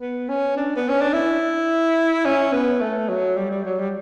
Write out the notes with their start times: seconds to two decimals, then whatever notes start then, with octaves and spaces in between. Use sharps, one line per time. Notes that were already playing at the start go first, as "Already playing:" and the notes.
0.01 B3
0.29 C#4
0.57 D4
0.76 B3
0.89 C#4
1.01 D4
1.13 E4
2.26 C#4
2.53 B3
2.81 A3
3.09 F#3
3.37 G3
3.51 G3
3.65 F#3
3.79 G3